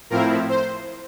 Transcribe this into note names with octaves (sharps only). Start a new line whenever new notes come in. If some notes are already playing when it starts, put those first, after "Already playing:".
A2 F3 C4 E4 A#4
C5